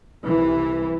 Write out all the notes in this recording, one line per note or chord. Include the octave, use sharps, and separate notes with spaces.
C2 C3 E3